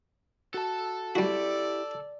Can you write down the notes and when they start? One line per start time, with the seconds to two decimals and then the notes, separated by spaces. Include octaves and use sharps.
0.54 F#4 A4 A5
1.15 G3 E4 F#4 G4 D5